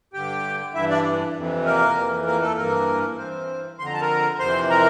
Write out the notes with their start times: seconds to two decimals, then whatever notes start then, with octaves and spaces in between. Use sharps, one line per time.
0.13 G2 D3 G4 G5
0.74 G2 E3 E4 E5
0.90 D4 D5
1.35 F2 C3 E3
1.66 A#3 A#4
1.96 F2 E3
2.26 A#3 A#4
2.42 A3 A4
2.56 G2 E3 A#3 A#4
3.18 G2 E3 C4 C5
3.79 F2 D3 C6
3.86 A#5
3.93 A5
4.01 A#4 A#5
4.39 F2 C3 E3 C5 C6
4.70 A#4 A#5